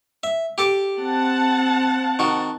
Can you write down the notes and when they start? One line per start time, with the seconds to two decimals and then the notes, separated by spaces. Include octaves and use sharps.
0.23 E5
0.58 G4 A4 D6
0.97 C4 F#5 A5
2.19 D#3 F#4